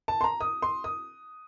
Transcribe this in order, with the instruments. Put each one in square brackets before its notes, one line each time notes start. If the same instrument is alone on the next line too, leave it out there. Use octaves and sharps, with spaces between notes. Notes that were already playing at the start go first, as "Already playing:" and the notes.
[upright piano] A5
C6
A#5
D#6
C6
D#6